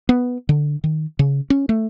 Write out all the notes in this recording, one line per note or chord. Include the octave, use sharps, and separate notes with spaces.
B3
D3
D#3
C#3
C#4
A3